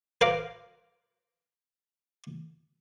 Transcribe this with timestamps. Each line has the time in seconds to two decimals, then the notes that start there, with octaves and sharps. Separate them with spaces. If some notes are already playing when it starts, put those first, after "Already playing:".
0.21 B4 C5 F5 A#5 D6